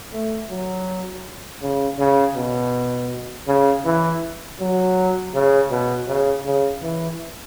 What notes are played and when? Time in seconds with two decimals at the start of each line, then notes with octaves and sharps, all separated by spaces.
0.13 A3
0.50 F#3
1.62 C#3
1.99 C#3
2.36 B2
3.48 C#3
3.85 E3
4.60 F#3
5.34 C#3
5.71 B2
6.08 C#3
6.46 C#3
6.82 E3